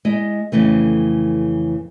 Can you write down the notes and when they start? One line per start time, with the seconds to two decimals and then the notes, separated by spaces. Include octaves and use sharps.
0.05 G#3 E4 D#5
0.52 F2 C#3 E3 A3